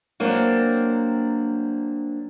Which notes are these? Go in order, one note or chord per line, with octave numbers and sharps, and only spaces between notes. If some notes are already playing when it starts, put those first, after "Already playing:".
F#3 A#3 C4 D4